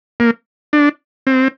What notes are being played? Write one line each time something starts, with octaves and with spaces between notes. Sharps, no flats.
A#3
D4
C4